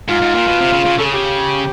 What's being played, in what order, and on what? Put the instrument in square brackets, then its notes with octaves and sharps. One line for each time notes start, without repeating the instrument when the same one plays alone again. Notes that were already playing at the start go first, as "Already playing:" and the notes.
[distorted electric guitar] G#2 [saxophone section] F4
[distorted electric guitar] G#2
A#2
B2
C3
C#3
C#3
[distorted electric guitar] C#3 [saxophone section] A4
[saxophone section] G#4
G4